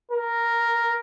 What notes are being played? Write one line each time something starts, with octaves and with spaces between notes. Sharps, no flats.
A#4